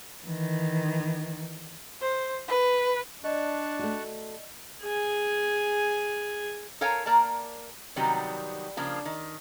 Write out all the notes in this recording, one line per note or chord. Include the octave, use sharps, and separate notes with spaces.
D#3 E3
C5
B4
D4 D5 D#5 A5 C#6 F#6
A3 F#4
G#4 G#5
A4 A#4 C#5 F5 G#5
A#3 A#4 D5 A5
C3 D#3 F#3 G3 B3
C#3 F3 A#3 D4
D#3